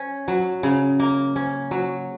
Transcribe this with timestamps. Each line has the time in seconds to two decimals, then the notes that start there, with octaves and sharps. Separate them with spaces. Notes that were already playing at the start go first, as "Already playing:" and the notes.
Already playing: C#4
0.28 F#3
0.63 C#3
0.99 A#3
1.36 C#4
1.71 F#3